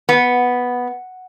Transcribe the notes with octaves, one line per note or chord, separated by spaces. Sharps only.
B3